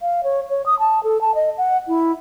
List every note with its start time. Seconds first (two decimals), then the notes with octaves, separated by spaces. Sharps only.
0.01 F5
0.24 C#5
0.50 C#5
0.66 D#6
0.79 A5
1.04 A4
1.21 A5
1.35 D#5
1.58 F#5
1.88 E4